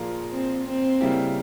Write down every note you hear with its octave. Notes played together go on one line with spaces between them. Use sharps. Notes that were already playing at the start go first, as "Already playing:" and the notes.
Already playing: A#2 F3 A#3 F4 G#4
C4
C4
C#3 G3 A#3 E4 G4